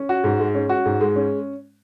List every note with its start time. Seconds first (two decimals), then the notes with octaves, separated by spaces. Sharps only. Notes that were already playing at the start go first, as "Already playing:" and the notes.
Already playing: C#4
0.09 F#4
0.24 G#2
0.39 G#3
0.54 C#4
0.69 F#4
0.86 G#2
1.01 G#3
1.16 C#4